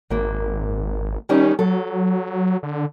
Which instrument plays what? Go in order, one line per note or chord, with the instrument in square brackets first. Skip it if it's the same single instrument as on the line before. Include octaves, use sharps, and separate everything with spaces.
[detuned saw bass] G#1 [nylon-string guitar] F#2 A#3
[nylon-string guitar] D#3 G3 D#4 [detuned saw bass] C#4
[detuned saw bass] F#3 [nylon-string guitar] A4
[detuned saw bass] D3